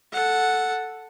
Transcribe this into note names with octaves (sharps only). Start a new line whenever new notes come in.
A4 F#5